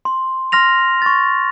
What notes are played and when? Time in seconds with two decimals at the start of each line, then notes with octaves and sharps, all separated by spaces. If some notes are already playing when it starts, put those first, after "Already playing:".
0.05 C6
0.52 C6 F6 A#6 F7
1.02 C#6 A6